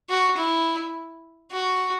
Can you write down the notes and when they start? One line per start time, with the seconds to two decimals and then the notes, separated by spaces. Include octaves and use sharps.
0.09 F#4
0.37 E4
1.52 F#4